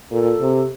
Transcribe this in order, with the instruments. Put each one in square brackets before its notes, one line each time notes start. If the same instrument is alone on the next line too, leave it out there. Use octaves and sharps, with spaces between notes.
[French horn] A#2 [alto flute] A4
[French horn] C3